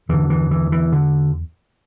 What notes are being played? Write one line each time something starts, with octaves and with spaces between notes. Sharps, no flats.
E2 D3 E3
E3
E3
E3
D3